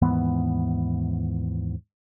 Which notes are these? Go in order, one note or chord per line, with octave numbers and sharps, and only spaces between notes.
D#2 G#2 E3 B3